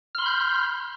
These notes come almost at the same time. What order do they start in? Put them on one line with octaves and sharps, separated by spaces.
F6 C6 B5 G6